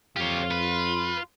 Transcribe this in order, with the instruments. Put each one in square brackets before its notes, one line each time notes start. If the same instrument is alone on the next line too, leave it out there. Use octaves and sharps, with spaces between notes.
[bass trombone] F2 [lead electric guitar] F4 [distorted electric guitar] G4 C#5
[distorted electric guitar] B4